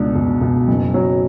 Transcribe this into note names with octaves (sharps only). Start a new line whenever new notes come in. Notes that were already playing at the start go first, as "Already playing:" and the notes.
Already playing: C#2 B2 D4
B2
B2
F#1
F#3